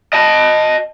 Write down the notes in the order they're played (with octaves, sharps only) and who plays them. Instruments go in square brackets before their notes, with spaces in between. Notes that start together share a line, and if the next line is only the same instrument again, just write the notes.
[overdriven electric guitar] D#5 A5